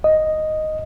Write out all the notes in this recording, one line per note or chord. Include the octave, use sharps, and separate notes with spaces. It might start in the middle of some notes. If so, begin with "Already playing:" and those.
D#5